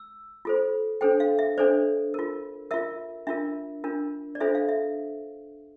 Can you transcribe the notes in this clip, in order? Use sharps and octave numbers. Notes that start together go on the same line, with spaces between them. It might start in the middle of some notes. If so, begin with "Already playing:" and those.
Already playing: E6
F4 A4 C5
D4 A4 C5 G5
F5
E5
D4 A4 C5 D5
F4 A#4
F4 A#4 E5
D4 F4 A#4 E5
D4 F4 A#4
D5
D4 F4 A4 C5 E5
F5
E5